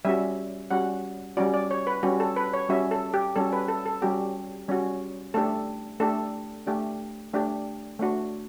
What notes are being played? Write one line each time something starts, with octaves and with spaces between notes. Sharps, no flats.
G3 C#4 F#4 E5
G3 C#4 F#4 F#5
G3 C#4 F#4 D5
D5
C#5
B4
G3 C#4 F#4 G4
A4
B4
C#5
G3 C#4 F#4 E5
A4
G4
G3 C#4 F#4 A4
B4
A4
A4
G3 C#4 F#4 G4
G3 C#4 F#4
A3 D4 G4 A4
A3 D4 G4 A4
A3 D4 G4
A3 D4 G4
A3 D4 F#4